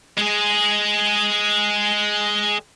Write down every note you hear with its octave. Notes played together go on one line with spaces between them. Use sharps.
G#3 G#4